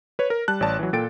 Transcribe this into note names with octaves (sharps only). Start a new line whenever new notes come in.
B4 C#5
A#4
G3 A5 F#6
A1 C#5 D5 A5
E3 F#3
A#2 A4 G5 A6 D7